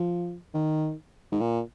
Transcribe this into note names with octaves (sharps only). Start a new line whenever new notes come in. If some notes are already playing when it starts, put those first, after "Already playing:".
Already playing: F3
D#3
G#2
A#2